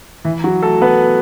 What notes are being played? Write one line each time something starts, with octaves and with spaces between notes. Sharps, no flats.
E3 E4
F#3 F#4
A3 A4
B3 B4